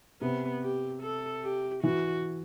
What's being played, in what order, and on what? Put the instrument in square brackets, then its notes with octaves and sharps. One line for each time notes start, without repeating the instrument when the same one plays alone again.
[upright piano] C3 [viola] B3
[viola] G4
A4
G4
[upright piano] E3 [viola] F#4